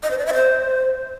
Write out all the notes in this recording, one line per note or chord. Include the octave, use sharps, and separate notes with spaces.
D#5
C5
D5
E5
C5